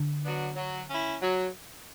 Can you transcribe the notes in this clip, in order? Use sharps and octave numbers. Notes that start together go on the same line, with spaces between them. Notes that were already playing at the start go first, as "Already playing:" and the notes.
Already playing: D3
F#3 B3 D4
F#3
C#4 E4
F#3